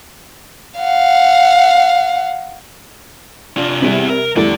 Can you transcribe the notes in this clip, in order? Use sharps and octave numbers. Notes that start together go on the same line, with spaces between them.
F5 F#5
C3 D4 F4
C3 G3 E4 G#4
A#4
E2 D3 G3 A3 D5